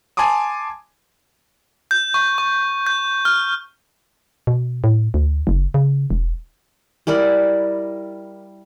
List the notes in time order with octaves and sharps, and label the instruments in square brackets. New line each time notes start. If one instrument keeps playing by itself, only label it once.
[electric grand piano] G#5 A5 C6 D6 D#6
[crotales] G6
C#6
C#6
G6
F6
[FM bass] B2
A2
D2
F#1
C#3
E1
[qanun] G3 E4 A#4 D5